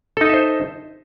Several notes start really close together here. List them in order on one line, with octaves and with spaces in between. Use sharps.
A4 D#4 D#5 E5 C5